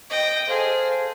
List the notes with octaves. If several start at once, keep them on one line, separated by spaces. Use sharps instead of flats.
D#5 G5
G#4 A4 C5 F5